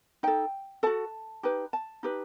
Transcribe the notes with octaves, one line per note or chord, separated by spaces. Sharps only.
D#4 A4 G5
F#4 A4 A5
D#4 G4 B4
A5
D#4 G4 B4